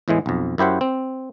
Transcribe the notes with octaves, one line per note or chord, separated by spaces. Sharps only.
E2 A2 E3 G#3
B1 F2
F#2 E4 G4 C5 F#5
C4